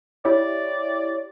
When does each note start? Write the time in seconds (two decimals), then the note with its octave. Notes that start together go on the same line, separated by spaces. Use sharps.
0.25 E4 G4 C#5 D5